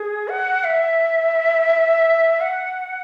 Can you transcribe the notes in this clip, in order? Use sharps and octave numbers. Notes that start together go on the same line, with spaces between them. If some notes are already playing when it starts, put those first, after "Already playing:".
Already playing: G#4
F#5
E5
F#5